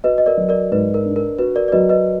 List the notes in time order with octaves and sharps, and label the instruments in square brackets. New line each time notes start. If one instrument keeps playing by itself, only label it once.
[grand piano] F#4 [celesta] B4 D#5
[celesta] D#5
A#4 D5
[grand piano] F#3
[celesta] A#4 D5
[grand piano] G#2 [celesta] B4
[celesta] A#4
[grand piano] D4
[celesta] A#4
[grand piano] F#4 [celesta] B4
[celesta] A#4 D5
D5
[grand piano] F#3 [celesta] B4 D#5
[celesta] B4 D#5